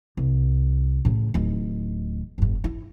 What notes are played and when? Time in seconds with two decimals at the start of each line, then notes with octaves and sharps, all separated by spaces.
0.17 C2
1.05 A2 C#3
1.34 D1 D#3
2.38 F#1 G#2
2.64 E4